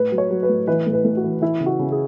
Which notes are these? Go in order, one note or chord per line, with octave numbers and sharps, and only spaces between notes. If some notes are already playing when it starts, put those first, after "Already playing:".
Already playing: A2 B4
F#3
C#5
F#3
B4
A2
E3 B4
A2
B4
A2
F#4
E3
E3 E4
C#3
F#4
C#3
G#4